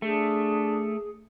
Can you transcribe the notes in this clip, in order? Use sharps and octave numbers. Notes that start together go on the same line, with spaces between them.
A3 D4 G#4